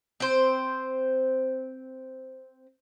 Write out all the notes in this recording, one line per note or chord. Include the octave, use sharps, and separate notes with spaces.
C4 C5